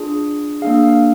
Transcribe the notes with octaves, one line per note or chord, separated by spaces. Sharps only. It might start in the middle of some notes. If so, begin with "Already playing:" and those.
Already playing: D4 F4 G#4
A#3 D4 G#4 F5
F5